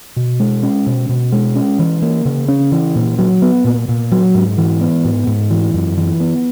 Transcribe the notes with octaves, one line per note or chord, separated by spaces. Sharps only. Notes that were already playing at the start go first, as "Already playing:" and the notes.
B2
G#3
C#4
B2
B2
G#3
C#4
E3
A#3
C#3
C#4
E3
A#2
F#3
B3
A#2
A#2
F#3
G#2
E3
B3
G#2
G#2
E3
F#2
E3
B3